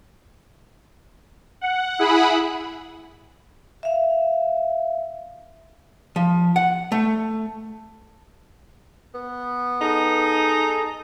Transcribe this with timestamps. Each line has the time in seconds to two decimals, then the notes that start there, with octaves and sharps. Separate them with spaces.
1.61 F#5
1.99 E4 G#4 F#5 B5
3.83 E5 F5
6.16 F3
6.56 F#5
6.92 A3
9.15 B3
9.81 D#4 G#4 A4